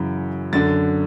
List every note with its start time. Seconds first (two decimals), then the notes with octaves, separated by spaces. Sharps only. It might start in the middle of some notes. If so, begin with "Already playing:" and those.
Already playing: F#2 C#3 E3
0.53 F#2 D3 A6